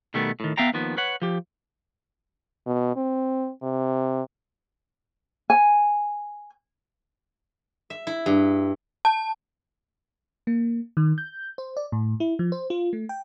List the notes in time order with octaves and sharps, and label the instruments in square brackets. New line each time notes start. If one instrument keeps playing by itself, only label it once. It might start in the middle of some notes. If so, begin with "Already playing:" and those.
[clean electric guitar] B2 D#3 G3 A3 B3
A2 D#3
B3 E5 F5 G5 A#5
D#2 D#3 F3 B3
B4 C#5 F#5
F3 G4
[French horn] B2
C4
C3
[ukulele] G#5
[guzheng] E5
E4
G2
[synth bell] A5
[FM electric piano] A#3
D#3
G6
C5
D5
A2
E4
F3
C5
F4
A3
G5